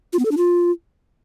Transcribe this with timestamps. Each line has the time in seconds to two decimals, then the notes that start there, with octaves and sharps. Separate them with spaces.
0.13 F4
0.19 B3
0.25 A4
0.31 D4
0.37 F4